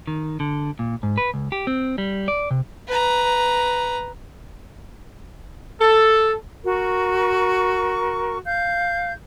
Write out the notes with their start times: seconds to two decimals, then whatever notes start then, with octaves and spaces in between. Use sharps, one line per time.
0.07 D#3
0.40 D3
0.79 A#2
1.03 G#2
1.18 B4
1.34 C#2
1.52 G4
1.67 C4
1.98 G3
2.28 D5
2.51 C3
2.88 B4 A#5
5.81 A4
6.65 F#4 A#4 C#6
8.45 F5 G6